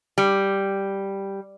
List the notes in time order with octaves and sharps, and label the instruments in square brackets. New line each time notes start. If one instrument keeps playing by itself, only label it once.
[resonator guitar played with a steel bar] G3